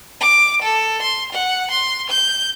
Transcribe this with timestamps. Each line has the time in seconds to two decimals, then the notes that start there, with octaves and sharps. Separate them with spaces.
0.21 D6
0.62 A4
1.02 C6
1.32 F#5
1.71 C6
2.10 G6